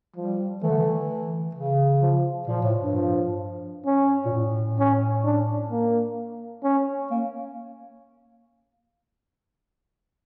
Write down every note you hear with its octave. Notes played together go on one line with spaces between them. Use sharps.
F3 G3
E3 A3
D3
E3
C#3
F3
A#2 F3
A2
G2
F3
C#4
A#2
A2
C#4
D4
A#3
C#4
A#3